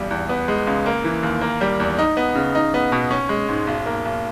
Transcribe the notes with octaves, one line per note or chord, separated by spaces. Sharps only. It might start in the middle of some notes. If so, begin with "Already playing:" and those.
Already playing: B1 E2 G3
E2
B3
G#3
C#2
A#3
E3
D#2
A#3
G3
E2
D#4
B3
C#3
D#4
B3
B2
C#4
G#3
G#2
B1
A#3
B1